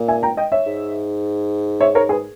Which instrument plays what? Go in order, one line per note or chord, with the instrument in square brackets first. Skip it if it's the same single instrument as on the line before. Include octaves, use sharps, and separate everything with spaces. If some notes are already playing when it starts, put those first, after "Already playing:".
Already playing: [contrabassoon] A#2
[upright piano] E5 G#5
G5 A#5
D#5 G5
C#5 E5
[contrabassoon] G#2
[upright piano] C#5 E5
A#4 C#5
G#4 B4